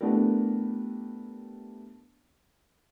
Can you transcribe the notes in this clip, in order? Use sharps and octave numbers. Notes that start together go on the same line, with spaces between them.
A3 B3 D4 E4 G4 A#4